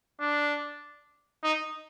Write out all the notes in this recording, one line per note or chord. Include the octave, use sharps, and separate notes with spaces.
D4
D#4